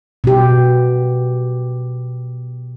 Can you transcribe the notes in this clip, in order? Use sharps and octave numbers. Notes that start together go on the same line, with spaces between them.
B2 G4